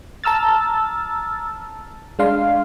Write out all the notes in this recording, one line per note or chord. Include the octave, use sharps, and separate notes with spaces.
A5 A#5 E6 F6 A6
G#3 D4 F5 C6